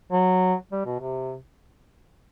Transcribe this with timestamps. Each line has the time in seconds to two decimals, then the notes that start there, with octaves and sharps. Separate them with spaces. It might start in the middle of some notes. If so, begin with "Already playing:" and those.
0.12 F#3
0.72 G3
0.86 B2
0.99 C3